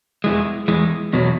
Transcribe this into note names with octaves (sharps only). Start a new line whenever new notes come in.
E2 E3 G#3
E2 E3 G#3
E2 B2 F#3